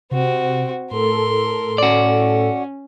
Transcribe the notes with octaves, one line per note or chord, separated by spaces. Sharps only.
C3 C4 F#4
A2 A4 A#4 C6
C#4 F#4 D5